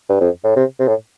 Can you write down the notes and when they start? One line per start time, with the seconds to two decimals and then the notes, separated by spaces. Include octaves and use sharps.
0.09 G2
0.21 F2
0.44 A2
0.56 C3
0.79 C3
0.88 A2